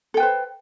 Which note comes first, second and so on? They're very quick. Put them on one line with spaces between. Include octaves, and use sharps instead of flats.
A4 G5 B4 C5